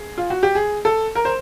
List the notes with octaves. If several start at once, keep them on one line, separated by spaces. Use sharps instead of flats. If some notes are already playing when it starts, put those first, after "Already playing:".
Already playing: G#4
F4
F#4
G4
G#4
A4
A#4
C5